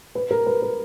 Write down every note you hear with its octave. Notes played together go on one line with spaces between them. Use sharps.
B4
A#4
B4
A#4